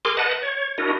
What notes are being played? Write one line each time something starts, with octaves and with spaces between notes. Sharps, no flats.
G#4 A#4 C6 D6
B4 D#5 F#5 A5
C#5
D4 E4 F#4 A#4 D#5